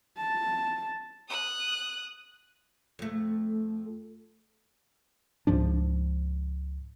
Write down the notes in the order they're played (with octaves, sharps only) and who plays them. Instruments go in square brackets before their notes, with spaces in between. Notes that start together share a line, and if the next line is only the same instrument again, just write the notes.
[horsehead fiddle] A5
[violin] D#6 F#6
[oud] F2 A3
[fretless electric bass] C#2 G#2 F3 D4